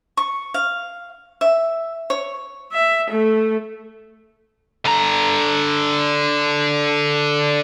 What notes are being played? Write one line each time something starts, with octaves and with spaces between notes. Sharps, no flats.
C#6
F5
E5
C#5
E5
A3
D3 A#5